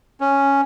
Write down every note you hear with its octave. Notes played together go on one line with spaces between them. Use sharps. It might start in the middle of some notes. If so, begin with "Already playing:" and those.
C#4